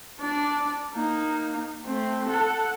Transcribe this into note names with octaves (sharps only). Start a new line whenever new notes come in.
D4 D5
A#3 D#4
A3 C4
A4 F#5